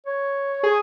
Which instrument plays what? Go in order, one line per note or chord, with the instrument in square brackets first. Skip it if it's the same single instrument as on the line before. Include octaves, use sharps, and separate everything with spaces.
[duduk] C#5
[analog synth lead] G#4